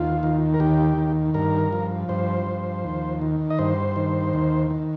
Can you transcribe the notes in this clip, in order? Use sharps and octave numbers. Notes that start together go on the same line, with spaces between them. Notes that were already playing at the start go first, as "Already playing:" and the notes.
Already playing: D#2 F4
D#3
A#4
D#2 G4
D#3
G2 A#4
F3
G2 C5
F3
D#2
D#3
D#5
G2 C5
D#3
D#2
D#3